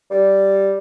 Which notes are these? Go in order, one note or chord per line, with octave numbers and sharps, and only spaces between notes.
G3